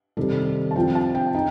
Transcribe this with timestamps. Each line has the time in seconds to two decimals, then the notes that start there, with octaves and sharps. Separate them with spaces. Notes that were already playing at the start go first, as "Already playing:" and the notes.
0.17 C3 D#3 G3 A4
0.71 A5
0.76 F3 C4 F4 G5
0.95 A5
1.15 G5
1.34 D#4 G5